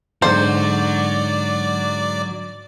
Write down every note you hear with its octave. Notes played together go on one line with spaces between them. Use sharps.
G#2 D3 F#3 D#4 F#4 C5 D5